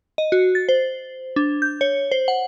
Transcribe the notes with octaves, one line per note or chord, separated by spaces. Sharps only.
D#5
F#4
A6
C5
D4
G6
C#5
C5
F#5